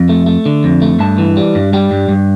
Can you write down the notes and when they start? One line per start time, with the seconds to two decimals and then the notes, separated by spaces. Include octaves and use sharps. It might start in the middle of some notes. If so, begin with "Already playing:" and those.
Already playing: F2
0.09 A3
0.26 A3
0.46 D3
0.64 F2
0.82 A3
0.99 G2 A5
1.18 E3
1.37 G3
1.55 G2
1.73 G3 G5
1.91 G2
2.09 G2